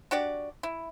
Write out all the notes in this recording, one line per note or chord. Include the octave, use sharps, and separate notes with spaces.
D4 F#4 G4 D5
E4